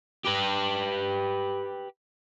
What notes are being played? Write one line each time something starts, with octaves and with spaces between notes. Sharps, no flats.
G4 B4